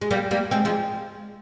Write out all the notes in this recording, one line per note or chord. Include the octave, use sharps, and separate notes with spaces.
G#3
G3 A#3
G3 A#3
G#3 C4
F3 G#3